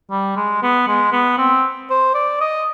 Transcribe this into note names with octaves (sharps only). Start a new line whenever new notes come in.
G3
G#3
B3
G#3
B3
C4
C5
D5
D#5